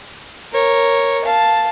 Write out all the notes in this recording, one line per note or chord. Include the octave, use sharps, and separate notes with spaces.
A#4 C#5
F5 A5